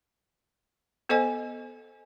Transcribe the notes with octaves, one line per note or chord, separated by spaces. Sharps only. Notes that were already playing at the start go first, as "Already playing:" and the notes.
B3 A4 C5 D#5 G#5